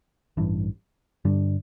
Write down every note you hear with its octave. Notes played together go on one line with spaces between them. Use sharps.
A1 G2 E3
G2 D3 G3 D4